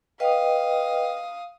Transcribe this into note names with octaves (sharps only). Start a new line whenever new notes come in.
B4 D#5 F5 G5 D#6